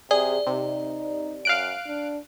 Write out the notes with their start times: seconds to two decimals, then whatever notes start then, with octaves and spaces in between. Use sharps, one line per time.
0.11 C3 G#4 D5
0.47 C3 D#4
1.45 F#2 F5 F#6 D7
1.87 D4